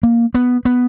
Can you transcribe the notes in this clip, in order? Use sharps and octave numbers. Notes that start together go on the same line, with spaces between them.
A#3
B3
B3